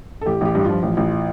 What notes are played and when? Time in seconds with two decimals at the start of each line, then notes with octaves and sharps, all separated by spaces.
0.21 A4
0.26 A1 G4
0.41 A1 G4
0.55 G2
0.65 F3 F4
0.83 A1
0.97 A1